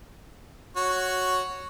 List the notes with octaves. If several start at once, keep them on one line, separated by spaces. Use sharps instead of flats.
F#4 C#5